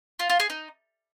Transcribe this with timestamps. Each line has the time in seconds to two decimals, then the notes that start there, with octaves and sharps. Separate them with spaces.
0.19 F4
0.30 F4
0.40 G#4
0.50 D#4